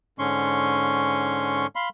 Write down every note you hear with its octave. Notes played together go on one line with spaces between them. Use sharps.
G#2 D3 C#4 C6 C#6
F5 B5 C6